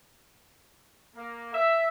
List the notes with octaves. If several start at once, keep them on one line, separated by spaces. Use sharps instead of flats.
A#3
E5